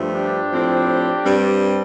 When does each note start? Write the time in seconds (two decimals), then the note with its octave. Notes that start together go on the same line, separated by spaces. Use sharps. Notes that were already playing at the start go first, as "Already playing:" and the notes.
Already playing: G2 F3 A3
0.15 D4 G4
0.52 A2 F3 C4
1.23 G2 G3 C4